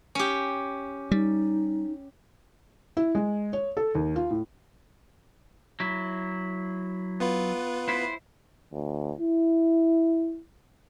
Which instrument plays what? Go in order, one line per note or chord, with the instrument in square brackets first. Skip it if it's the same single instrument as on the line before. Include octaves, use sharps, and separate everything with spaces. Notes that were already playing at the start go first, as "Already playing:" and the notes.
[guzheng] C#4 G4
[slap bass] G3 [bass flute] D#4
[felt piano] E4
G#3
C#5
A4
D#2
F4
A2
[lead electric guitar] F#3 E4
[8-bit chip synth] B3 F4 B4
[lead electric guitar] E4 C5
[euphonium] D2
E4